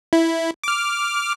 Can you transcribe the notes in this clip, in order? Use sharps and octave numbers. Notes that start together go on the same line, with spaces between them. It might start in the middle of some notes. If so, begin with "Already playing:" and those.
E4
D6 F6